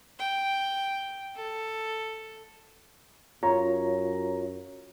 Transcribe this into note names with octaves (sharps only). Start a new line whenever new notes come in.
G5
A4
F#2 F4 C#5 A#5